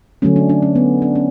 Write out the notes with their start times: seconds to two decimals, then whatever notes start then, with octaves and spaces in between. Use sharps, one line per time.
0.22 D3 F#3 A3 C#4
0.36 D4
0.49 D4
0.62 C#4
0.76 B3
1.02 D4
1.15 C#4